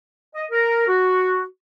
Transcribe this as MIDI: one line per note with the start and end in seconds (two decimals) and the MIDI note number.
0.35 0.45 75
0.51 0.87 70
0.88 1.43 66